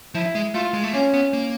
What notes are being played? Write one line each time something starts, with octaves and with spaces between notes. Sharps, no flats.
F3 E4
G#3
A3 F4
G#3
A3
A#3 C#4
B3
A#3